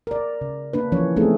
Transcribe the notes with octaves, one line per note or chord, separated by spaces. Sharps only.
A#4 D5
C#3
A#3 D4 B4
E3 F3 C#4 C#5
A3 B3 C4 D#4 G#4 A4